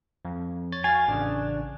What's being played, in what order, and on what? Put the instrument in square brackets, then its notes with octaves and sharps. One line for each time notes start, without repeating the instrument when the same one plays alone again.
[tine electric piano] F2
C#5 A6
[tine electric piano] F#4 A6 [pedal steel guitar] F5 G#5
[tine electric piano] A1 C#3 [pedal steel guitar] D4